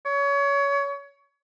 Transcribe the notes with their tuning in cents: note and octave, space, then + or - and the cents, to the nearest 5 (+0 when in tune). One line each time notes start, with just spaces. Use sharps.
C#5 +25